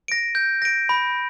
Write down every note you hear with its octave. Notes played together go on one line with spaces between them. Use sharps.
A#6 D7
G6
A#6 D7
B5